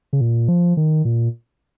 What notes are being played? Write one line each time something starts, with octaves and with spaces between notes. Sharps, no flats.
C#3
A#2
F3
D#3
A#2